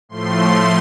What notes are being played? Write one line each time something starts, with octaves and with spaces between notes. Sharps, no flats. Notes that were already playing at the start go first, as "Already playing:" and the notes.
A2 F3 A3 C6